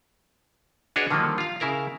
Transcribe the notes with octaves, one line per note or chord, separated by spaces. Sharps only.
D4 F#4 G#4 B4 C#5 D#5
D3 D#3 F3 G3 A#3
F4 F5
C#3 E4 A#4 A#5